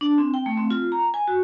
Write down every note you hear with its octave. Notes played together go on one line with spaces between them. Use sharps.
D4
C4
G5
A3
C4
F4
A#5
G#5
F#4